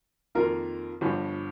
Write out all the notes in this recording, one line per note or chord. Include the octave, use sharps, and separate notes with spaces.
F2 D#3 A#3 F4 A#4
G1 G2 F3